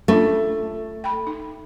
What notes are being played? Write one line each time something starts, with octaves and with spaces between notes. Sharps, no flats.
A3 C#4 D4 F4
G5 B5
D#4